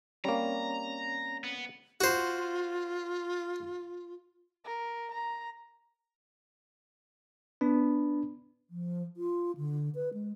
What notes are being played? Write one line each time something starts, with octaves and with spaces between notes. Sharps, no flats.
G3 A#3 C4 C#4 C#5 A#5
B3
F4 F#4 C5
A#4
A#5
B3 D4
F3
F4
D3
B4
G#3